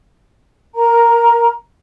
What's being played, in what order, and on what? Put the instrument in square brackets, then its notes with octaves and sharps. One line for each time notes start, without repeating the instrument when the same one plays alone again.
[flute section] A#4 A#5